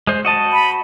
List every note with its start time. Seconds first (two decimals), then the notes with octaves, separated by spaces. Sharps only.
0.07 G#3 C5
0.25 F#4 D#5 A5
0.53 B5